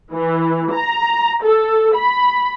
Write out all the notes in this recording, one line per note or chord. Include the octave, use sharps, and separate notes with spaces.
E3
A#5
A4
B5